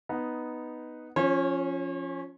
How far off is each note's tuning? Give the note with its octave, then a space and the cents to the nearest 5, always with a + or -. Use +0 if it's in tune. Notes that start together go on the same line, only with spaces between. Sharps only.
B3 +0 D#4 +0
F3 +0 C#4 +0 C#5 -45